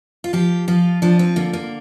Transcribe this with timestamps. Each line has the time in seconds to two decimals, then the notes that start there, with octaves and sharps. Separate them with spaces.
0.24 F4
0.33 F3 G4
0.68 F3 F4
1.02 F3 D4
1.19 C4
1.36 D3 A#3
1.53 A#3